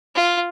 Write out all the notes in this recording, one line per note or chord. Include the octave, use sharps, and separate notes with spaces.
F4